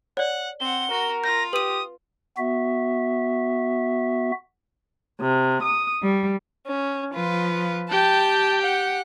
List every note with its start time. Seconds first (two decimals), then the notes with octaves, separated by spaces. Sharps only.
0.17 C#5 D5 F#5
0.60 C4 F#5 G7
0.90 F#4 A#4
1.24 F4 G6 A#6
1.53 G4 B4 D#6 D#7
2.38 B3 F#4 E5
5.20 C3
5.61 D#6
6.02 G3
6.67 C#4
7.12 F3 F4 B4
7.90 G4 G5 A5
8.61 F#5